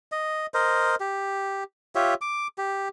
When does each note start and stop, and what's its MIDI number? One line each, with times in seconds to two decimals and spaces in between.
0.12 0.46 75
0.54 0.95 70
0.54 0.95 72
0.54 0.95 75
1.00 1.64 67
1.95 2.14 65
1.95 2.14 67
1.95 2.14 73
1.95 2.14 76
2.21 2.47 86
2.58 2.88 67